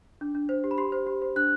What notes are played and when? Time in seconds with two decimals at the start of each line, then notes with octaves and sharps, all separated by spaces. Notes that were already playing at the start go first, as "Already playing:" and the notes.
0.21 D4
0.35 D4
0.49 C5
0.64 G4
0.71 B5
0.78 G4 C6
0.92 C5
1.07 G4
1.22 C5
1.36 D4 F#6